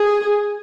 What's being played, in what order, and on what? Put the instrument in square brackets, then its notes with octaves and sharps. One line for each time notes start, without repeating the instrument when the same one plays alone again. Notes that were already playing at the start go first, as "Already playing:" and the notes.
Already playing: [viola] G#4